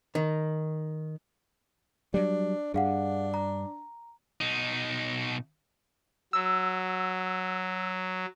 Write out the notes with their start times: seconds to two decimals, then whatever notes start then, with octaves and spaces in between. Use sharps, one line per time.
0.15 D#3
2.14 F#3 G3 D4
2.74 G2 D4 G#4 F5 F#5
3.34 A#5
4.41 B2 D#4
6.33 F#3 E6